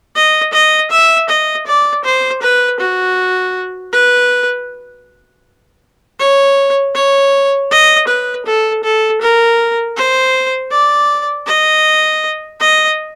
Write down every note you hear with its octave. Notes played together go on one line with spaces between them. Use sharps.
D#5
D#5
E5
D#5
D5
C5
B4
F#4
B4
C#5
C#5
D#5
B4
A4
A4
A#4
C5
D5
D#5
D#5